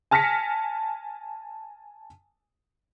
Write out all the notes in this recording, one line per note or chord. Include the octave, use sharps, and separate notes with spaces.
G#5 A5 F6 A#6 B6 C#7